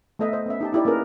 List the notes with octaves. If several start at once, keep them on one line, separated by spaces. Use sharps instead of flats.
A3 B3 A4 D#5 E5
C5 D#5
B3 C#4 E5
D#4 G4 A5
D#4 E4 G4 D5
A#3 C#4 G#4 A#4 B4